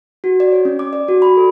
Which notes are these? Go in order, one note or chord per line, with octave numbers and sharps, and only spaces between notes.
F#4
D5
C#5
C#4
D6
D5
F#4
B5
A4